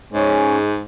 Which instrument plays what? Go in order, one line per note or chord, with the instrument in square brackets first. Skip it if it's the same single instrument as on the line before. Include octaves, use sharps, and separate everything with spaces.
[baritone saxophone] G#2 [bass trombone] G#3 [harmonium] C#4